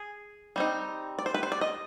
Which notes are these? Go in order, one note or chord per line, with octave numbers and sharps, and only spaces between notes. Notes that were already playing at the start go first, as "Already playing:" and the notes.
Already playing: G#4
G3 C4 D#4
D5
C5
B4
C5
D5
D#5